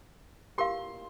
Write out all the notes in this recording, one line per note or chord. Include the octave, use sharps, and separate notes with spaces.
G4 A#4 F5 C6